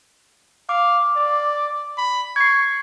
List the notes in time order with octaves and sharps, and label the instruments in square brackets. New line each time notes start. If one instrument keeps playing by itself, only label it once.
[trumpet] F5 [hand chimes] D6
[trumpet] D5
B5
[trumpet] C#6 [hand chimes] G#6 C7